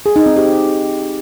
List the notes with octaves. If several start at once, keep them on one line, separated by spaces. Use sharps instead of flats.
G#4
D#4
C4
G4